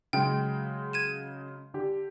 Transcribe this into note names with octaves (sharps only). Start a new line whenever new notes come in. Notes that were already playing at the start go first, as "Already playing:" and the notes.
C#3 F#3 G#3 G5
G#6 D#7 E7
D3 G4